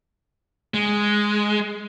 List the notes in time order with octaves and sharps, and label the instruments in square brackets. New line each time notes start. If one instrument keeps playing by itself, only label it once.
[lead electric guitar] G#3